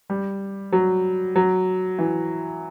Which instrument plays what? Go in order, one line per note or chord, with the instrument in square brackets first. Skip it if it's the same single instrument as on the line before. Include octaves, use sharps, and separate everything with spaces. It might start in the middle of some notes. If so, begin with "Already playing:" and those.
[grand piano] G3
F#3
F#3
E3